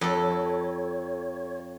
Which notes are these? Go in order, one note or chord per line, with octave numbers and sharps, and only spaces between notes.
F2 A4 C#5